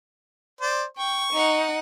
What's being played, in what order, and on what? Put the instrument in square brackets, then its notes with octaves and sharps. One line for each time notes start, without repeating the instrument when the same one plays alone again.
[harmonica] C5 D5
[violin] G5 [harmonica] C#6
[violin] D#4 F#5